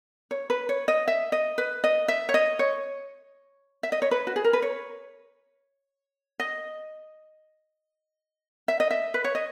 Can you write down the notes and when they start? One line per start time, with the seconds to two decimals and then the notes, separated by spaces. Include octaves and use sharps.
0.31 C#5
0.50 B4
0.69 C#5
0.88 D#5
1.08 E5
1.32 D#5
1.58 B4
1.84 D#5
2.08 E5
2.29 C#5
2.34 D#5
2.59 C#5
3.83 E5
3.92 D#5
4.02 C#5
4.11 B4
4.27 F#4
4.36 G#4
4.44 A#4
4.53 B4
4.62 C#5
6.40 D#5
8.68 E5
8.80 D#5
8.90 E5
9.14 B4
9.24 C#5
9.35 D#5